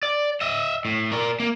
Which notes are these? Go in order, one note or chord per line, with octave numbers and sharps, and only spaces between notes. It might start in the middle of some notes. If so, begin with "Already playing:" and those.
D5
D#5 E5
A2
A#4 D5
A#3